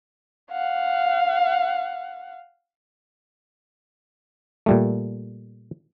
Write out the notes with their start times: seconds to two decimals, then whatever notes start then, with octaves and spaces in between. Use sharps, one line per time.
0.51 F5 F#5
4.66 A#2 G3 A3